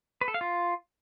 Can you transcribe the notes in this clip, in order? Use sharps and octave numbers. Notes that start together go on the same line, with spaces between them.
B4
A4
F5
F4